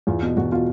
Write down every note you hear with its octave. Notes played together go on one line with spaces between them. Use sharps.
E2 F4
B2
E2 F#4
B2 F4